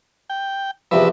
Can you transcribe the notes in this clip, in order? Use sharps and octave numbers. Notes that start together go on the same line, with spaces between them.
G5
E2 C3 F3 B4 E5